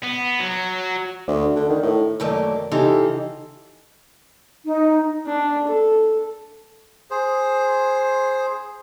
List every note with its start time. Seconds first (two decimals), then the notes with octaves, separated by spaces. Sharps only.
0.04 B3
0.39 F#3
1.27 D2
1.56 D3
1.69 D#3
1.83 A2
2.20 F#2 D#3 A3 A#3 D5
2.71 C#3 E3 D#4 F4 G4 A4
4.64 D#4
5.26 D4
5.68 A4
7.11 G#4 C5